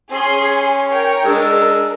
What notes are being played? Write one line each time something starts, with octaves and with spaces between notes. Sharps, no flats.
C#4 G#4 G#5 C6
A#4 C#5 G5
G#3 D4 E6